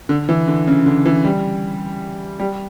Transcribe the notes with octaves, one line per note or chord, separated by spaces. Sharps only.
D3
E3
D3
C#3
D3
E3
G3
G3